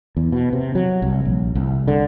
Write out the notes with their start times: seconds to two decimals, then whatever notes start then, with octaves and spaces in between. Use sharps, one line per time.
0.17 E2
0.32 B2
0.53 C3
0.75 F#3
1.02 C2
1.25 A#1
1.55 C2
1.88 D3